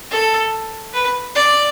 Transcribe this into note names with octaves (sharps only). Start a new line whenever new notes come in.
A4
B4
D5